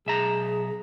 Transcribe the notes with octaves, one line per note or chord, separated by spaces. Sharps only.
B1 G#4 E5 A#5